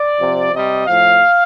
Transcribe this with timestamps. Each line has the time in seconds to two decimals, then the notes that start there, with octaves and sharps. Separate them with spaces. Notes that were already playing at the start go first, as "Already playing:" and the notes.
Already playing: D5
0.19 C3 F3
0.52 C3 G3 D#5
0.87 A2 F3 F5